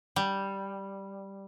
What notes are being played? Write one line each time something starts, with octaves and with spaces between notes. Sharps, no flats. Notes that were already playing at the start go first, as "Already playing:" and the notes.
G3